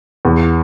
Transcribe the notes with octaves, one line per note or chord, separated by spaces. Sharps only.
E2